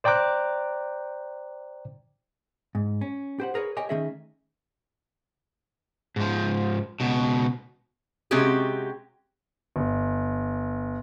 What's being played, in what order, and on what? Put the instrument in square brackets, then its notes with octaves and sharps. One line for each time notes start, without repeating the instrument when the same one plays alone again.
[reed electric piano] C5 D5 G5 A#5 D6 F#6
[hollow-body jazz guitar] G#2
C#4
G4 C5 F#5
G#4 A#4 B4 C#5
G4 A#4 C#5 D#5 G5 G#5
D#3 A3 C#4 G#4 D#5 E5
[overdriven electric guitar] G#2 F3
C#2 B2
[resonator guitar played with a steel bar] C3 G#3 C4 C#4 F#4 G4
[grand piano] G1